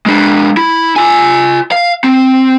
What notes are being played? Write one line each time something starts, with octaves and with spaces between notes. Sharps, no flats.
G#3 D4
E4
F4 G#5
F5
C4